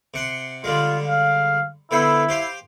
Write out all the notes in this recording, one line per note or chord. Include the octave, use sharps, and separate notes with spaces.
C3 F#5 C6
D3 G3 G#3 F4
F5
D3 B3 E4 C5
G4 C5 F5